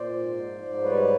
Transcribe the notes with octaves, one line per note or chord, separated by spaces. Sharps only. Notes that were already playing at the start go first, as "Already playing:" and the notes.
Already playing: A#2 C5 D5
G#2
F3
G#2
G3 B4 C#5